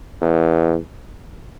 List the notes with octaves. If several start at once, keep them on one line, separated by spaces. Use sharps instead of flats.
E2